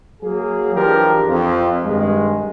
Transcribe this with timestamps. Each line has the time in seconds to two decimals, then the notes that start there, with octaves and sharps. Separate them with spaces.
0.22 F#3 A#3 G#4
0.75 E3 F3 D4 G4 A#4
1.25 F2
1.84 G2 D#3 G#3